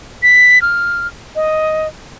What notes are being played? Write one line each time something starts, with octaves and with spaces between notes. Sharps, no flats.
B6
F6
D#5